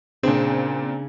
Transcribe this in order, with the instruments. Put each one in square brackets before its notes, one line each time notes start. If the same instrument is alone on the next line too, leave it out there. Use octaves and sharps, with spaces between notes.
[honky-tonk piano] A#2 C4 [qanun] C#3 [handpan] D4 [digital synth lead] G#4